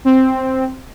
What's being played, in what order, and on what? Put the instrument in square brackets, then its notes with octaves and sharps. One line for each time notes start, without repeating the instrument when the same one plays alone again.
[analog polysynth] C4